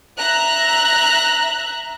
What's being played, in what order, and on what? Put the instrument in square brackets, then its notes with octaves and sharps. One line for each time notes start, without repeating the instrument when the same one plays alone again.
[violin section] E5 A#5 F#6